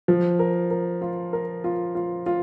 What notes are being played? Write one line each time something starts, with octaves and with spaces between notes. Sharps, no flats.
F3
A#4
A#4
F4
A#4
F4
F4
F4